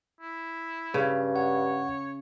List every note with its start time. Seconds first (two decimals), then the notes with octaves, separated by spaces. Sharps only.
0.20 E4
0.94 G2 C#3
1.36 C#5 F#5